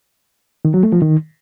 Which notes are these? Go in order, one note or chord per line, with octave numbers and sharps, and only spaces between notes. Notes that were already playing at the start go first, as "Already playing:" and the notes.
D#3
F#3
A3
F3
D#3